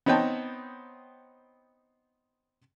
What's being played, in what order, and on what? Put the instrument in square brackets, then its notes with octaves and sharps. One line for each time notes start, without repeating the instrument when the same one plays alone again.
[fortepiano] B3 C4 D#4 C#5 G5 A5